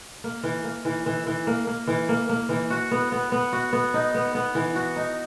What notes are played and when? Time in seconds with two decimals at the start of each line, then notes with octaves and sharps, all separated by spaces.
0.24 A#3
0.43 E3
0.64 A#3
0.85 E3
1.06 E3
1.27 E3
1.47 A#3
1.67 A#3
1.87 E3
2.09 A#3
2.29 A#3
2.49 E3
2.70 F#4
2.91 B3
3.12 B3
3.32 B3
3.53 F#4
3.73 B3
3.94 D#4
4.15 B3
4.35 B3
4.55 E3
4.75 F#4
4.96 D#4